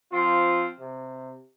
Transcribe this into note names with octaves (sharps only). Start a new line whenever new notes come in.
F3 C4 F4
C3